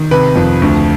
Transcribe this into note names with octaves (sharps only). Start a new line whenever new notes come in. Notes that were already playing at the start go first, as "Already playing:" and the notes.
Already playing: D#3
C3 B4
F2
D2